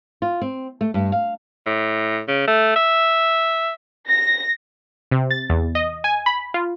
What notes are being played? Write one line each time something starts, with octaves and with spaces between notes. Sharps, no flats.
F4
C4
A3
G2
F5
A2
C#3
A3
E5
A#6
C3
A6
E2
D#5
G#5
B5
F4